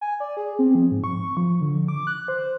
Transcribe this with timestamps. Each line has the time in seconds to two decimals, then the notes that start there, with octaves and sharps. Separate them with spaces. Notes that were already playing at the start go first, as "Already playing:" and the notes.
0.01 G#5
0.20 D5
0.37 G#4
0.59 C4
0.75 F3
0.91 G#2
1.04 C#6
1.37 F3
1.61 D3
1.88 D6
2.07 F#6
2.28 C5